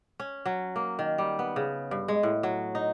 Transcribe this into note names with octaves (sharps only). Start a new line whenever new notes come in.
C#4
F#3
A#3
D#3
G3
B3
C#3
G2
G#3
A2
F#3
D#4